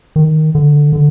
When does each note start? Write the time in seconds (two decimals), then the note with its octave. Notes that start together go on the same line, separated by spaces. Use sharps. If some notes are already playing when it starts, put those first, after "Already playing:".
0.16 D#3
0.55 D3
0.92 D3